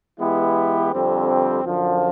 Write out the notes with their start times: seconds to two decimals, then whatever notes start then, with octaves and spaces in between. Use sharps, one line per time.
0.20 E3 G#3 B3 E4 G4
0.93 F2 D3 G3 C4
1.65 F#2 D3 F3